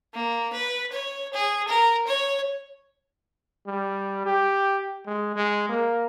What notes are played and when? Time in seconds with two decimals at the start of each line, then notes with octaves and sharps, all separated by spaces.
0.14 A#3
0.53 B4
0.92 C#5
1.34 G#4
1.68 A#4
2.07 C#5
3.67 G3
4.26 G4
5.06 G#3
5.36 G#3
5.69 A#3